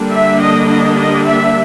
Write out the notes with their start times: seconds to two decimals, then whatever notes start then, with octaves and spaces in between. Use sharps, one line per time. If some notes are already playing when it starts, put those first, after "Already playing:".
Already playing: D3 G3 A#3 D4
0.11 E5
0.40 D#5
0.68 D#5
0.96 D#5
1.25 E5